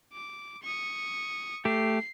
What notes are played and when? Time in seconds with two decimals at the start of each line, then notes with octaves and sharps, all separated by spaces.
0.13 D6
0.63 C#6 D#6
1.65 A3 G4 C7